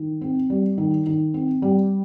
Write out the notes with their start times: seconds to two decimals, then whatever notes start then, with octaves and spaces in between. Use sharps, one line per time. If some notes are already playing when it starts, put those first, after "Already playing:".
Already playing: D#3
0.21 C4
0.50 G3
0.78 D#3
1.07 D#3
1.34 C4
1.62 G3